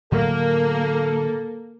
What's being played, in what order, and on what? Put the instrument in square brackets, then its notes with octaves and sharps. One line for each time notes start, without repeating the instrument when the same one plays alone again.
[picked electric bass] A2 D3 F#3 [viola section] A#3 [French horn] A4